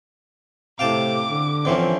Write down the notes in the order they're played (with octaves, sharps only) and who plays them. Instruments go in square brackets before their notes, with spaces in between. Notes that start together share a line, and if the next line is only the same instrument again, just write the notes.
[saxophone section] A2 C3 [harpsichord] F5 G5 A5 [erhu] D6
[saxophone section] D3
[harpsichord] D3 E3 C#4 [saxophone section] F3 C4